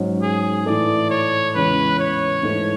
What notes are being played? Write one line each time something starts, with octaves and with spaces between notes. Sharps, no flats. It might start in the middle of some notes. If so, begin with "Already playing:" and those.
Already playing: G#2 F#3 C#4
G#4
A2 E3 A3 D5
C#5
E2 C#3 E3 G#3 C#4 B4
C#5
G#2 E3 A3